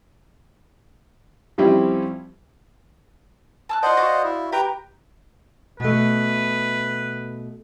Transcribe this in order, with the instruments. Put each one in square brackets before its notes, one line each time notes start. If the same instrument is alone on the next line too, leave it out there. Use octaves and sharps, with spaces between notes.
[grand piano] F3 G3 C4 C#4 E4 G4
[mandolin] A5 E6 F#6
[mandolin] F4 D5 [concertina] C5 D#5 F#5
[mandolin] F#4 D5 F5
[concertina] E4
[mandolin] G4 [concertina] B4 G5 A#5
[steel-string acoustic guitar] B2 A3 [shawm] B4